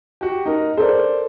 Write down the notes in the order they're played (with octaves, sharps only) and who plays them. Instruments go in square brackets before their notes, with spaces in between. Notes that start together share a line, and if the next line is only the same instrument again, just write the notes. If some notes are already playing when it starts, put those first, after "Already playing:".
[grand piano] F#4 G4
D#4 A#4
[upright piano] A4 A#4 [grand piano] C5 D5